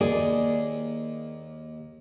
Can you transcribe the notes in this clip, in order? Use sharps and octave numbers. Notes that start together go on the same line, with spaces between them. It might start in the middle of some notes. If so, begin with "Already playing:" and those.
D#2 A#3 G#4 D5